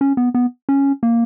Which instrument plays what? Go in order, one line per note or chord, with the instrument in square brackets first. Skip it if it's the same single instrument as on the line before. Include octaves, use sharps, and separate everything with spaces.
[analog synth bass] C#4
B3
B3
C#4
A#3